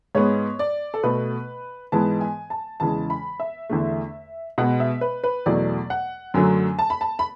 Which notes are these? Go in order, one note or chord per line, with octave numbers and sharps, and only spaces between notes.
G#2 G#3 B3 C#5
D5
A4
B2 A3 B4
G#2 E3 G#3 B3 A5
G#5
A5
E2 C#3 E3 G#3 A5
B5
E5
E2 D3 A3
B2 G#3 B3 F#5
E5
B4
B4
E2 B2 F#3 A3 D5
F#5
F#2 D3 F#3 A3 G#5
A5
B5
A5
B5